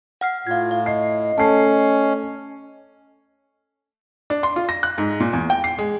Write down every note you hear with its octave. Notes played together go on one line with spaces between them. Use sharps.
F#5 F6 C7
A2 F4 F5 G#6
F5
D#5 C7
A3 C#4 A5 C7
D4
C6
F4
A#6
F#6
G#2
A#2
E2
G5
C7
G#3